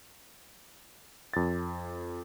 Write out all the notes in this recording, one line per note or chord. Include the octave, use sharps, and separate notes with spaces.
F2 A6